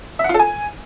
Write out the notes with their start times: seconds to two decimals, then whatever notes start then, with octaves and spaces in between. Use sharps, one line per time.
0.19 E5
0.24 F#5
0.29 F4
0.34 A4
0.39 G#5